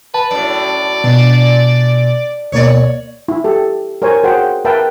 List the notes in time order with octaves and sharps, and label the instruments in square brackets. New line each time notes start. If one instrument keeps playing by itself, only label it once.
[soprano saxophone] B4 [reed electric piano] A5
[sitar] F#2 A2 [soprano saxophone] D5
[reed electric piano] B2 [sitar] D4
[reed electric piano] D2 B2 A#3 [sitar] C#5 D5
[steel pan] E4
G4 A4
A#4 C5 C#5 G#5
F#4 G#4 C5 F#5 G5
A#4 B4 E5 F5 G5 A5